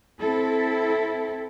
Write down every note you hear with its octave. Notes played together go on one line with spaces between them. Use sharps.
C4 E4 A4